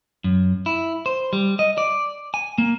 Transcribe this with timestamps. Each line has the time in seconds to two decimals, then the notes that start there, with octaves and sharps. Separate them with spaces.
0.24 F#2
0.66 E4
1.06 C5
1.33 G3
1.59 D#5
1.78 D5
2.34 G#5
2.58 A#3